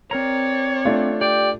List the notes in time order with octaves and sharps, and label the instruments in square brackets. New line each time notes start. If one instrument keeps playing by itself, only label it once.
[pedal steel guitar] C4 A#4 A#5 [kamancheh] C#5 D5
[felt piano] A3 D4 F4
[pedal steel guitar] G4 G5 [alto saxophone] D5